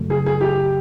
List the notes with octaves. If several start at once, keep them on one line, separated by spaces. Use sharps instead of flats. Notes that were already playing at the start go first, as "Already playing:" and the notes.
Already playing: F#2 C#3 F#3 A3
G#4
G#4
G4